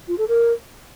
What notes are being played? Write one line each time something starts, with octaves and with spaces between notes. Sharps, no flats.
F4
A4
A#4